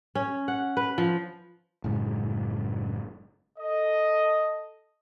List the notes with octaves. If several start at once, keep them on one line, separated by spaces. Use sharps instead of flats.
C#4
F#5
B4
F3
F#1 A2 G#3
A4 D#5